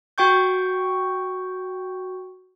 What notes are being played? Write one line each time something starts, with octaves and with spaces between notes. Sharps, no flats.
F#4 G5 C#6 G6